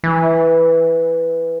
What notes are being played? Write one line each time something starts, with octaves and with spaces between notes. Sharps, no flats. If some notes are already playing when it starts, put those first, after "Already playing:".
E3